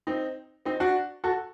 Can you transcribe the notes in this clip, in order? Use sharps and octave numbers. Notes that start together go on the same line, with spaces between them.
C4 D#4
C4 D#4
D4 F#4
F#4 A4